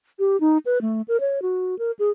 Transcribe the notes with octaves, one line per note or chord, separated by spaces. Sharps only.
G4
D#4
B4
A3
A#4
C#5
F#4
A#4
G#4